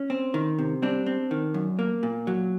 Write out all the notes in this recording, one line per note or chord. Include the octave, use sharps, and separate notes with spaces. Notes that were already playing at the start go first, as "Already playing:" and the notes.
Already playing: C#4
C4
D#3
C3
G3 C4 D4
C4
D#3
F#2
A#3
A#2
F#3